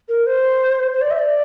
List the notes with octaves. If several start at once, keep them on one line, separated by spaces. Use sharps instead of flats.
A#4
C5
C5
D5
E5
D5